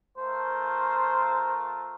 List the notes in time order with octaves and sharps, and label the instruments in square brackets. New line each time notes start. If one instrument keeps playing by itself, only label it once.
[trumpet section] A3 F4 A#4 [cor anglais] C5